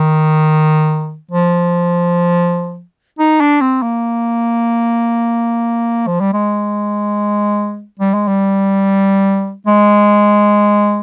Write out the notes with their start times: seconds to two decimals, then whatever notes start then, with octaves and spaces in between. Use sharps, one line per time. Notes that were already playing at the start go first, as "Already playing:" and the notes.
Already playing: D#3
1.31 F3
3.19 D#4
3.41 D4
3.61 C4
3.82 A#3
6.07 F3
6.21 G3
6.33 G#3
8.00 G3
8.14 G#3
8.28 G3
9.67 G#3